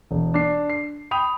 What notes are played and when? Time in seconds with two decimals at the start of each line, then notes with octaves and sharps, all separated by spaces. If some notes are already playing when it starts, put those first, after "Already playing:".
0.11 E1
0.34 D4 C7
0.70 C7
1.11 G5 B5 D#6 F7